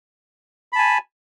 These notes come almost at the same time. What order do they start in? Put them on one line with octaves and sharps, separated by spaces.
B5 A5 G#5